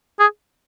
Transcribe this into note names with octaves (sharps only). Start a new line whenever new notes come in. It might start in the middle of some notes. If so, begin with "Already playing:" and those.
G#4